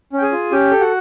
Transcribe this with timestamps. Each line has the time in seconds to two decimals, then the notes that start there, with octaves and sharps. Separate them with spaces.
0.13 C#4
0.18 G5
0.22 G#4 G#5
0.32 F4
0.51 C#4 G4 G5
0.72 A4
0.80 F#4 F#5